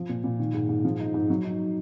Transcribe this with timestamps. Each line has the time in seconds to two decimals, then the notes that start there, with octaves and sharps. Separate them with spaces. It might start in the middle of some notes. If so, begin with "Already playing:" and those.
Already playing: F3
0.09 A#2
0.24 A#2
0.39 D#3
0.54 G#2
0.69 G#2
0.85 F3
0.99 D#4
1.14 G#2
1.30 F#3
1.44 D#4